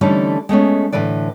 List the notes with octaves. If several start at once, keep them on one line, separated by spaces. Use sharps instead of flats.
D3 E3 G3 A3 C#4 D#4
G#3 A3 B3 C#4
A2 D3 E3 B4 D5